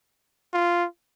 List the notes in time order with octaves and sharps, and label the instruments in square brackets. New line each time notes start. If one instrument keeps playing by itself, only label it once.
[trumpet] F4